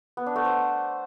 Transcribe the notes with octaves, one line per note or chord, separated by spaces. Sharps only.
B3
D4
A3
C5